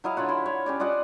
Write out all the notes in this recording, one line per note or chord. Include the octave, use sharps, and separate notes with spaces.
F#3 E4 D#5 F5
D3 F4 C#5 F#5
E4 C6
C#5
C#4 G4 D5
F4 D5 D#5 F#5